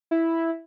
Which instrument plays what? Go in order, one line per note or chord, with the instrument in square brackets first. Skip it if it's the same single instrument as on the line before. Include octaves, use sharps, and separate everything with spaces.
[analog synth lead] E4